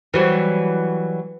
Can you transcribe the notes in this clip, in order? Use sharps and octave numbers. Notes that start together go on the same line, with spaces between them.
E3 F#3 G3